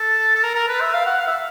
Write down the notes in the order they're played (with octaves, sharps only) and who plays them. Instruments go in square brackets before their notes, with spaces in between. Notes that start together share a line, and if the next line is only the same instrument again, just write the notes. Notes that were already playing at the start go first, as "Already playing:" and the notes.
Already playing: [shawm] A4
A4
A#4
A#4
B4
E5
F5
F#5
F5
E5